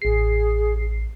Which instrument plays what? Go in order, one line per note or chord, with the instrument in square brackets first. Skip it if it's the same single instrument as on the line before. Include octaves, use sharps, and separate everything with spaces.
[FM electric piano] A1 C7 [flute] G#4